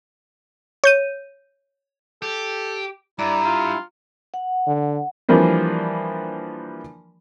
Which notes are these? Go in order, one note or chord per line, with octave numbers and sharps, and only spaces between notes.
C#5 G6 D#7
G4 A4
G2 E4 D5 A#5
F4
F#5
D3
E3 F3 G3 A#3 D4